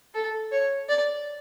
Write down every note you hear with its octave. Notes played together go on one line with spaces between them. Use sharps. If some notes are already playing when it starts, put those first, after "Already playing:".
A4
C#5
D5